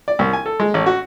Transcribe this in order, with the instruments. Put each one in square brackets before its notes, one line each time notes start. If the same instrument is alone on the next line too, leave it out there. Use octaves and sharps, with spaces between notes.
[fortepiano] D5
C2
G#5
A4
G#3
A1
F#4